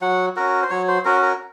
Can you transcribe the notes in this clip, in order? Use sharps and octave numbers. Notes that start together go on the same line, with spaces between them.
F#3 F#5
C#4 F#4 A#4
C5
F#3 C#5
C5
C#4 F#4 A#4
A#4